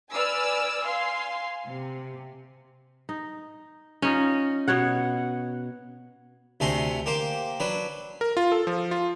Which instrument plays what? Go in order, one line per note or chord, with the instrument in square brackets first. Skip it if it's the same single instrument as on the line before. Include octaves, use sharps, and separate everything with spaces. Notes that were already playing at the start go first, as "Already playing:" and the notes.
[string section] B4 D5 G#5 E6 F6
F5 G#5 C6
C3
[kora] D#4
C#4 D#4 F4
B2 B3 C#5 F#5
[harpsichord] D2 C3 A3 G#5 A#5 C6
A#3 G4 C5
F#3 D4 B4
[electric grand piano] A#4
F4
A4
F3
F4